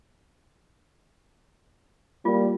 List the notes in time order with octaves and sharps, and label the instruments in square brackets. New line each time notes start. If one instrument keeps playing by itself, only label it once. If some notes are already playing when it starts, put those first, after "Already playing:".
[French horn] G3 [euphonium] A#3 [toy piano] F4